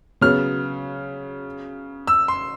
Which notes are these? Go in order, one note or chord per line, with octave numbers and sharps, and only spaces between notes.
C#3 F#3 B3 F6
E6
C6